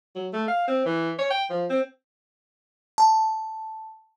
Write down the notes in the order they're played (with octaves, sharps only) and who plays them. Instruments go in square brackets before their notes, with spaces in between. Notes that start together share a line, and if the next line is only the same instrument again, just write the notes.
[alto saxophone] F#3
A3
F5
C4
E3
C#5
G5
F3
C4
[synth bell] A5